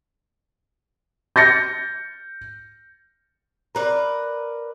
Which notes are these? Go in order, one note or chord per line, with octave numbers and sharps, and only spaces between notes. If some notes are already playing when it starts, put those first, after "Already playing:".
G6 A6 A#6 C#7
A#4 B4 C#5 D5